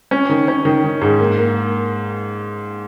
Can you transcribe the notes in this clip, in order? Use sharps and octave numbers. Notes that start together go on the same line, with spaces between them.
C#4
D#3
C#4
D#3
D#3
G#2
A#3
A#3